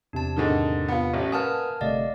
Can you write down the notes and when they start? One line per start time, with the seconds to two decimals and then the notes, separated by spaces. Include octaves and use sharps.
0.13 E2 C3 D4 A5
0.36 G#2 D3 D#3
0.88 B3 F4
1.14 A1
1.32 A#3 B4 F#5 G#5 A5 D#6 F6
1.81 G1 C3 A3 D5 D#5 F5